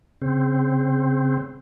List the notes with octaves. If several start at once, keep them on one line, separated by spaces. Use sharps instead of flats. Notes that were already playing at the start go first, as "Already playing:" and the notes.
C#3 C4